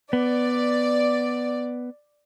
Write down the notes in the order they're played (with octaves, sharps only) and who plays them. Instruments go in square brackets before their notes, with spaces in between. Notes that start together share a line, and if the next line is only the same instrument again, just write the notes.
[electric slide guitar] B3 [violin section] D5